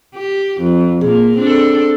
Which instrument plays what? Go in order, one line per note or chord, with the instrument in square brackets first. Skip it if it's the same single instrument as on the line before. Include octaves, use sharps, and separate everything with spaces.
[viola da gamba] G4
F2
[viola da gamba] A#2 A#3 [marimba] G#4
[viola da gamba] C4 D4 A4